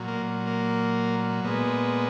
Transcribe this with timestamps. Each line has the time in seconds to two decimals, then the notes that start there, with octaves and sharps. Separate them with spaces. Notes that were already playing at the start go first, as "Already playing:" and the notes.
Already playing: A#2 F#3
0.08 A#3
0.47 A#3
1.45 A#2 G#3 B3